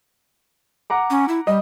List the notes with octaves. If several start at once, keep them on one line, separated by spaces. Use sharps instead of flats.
F#5 A#5 D6
C#4
E4
G3 D#5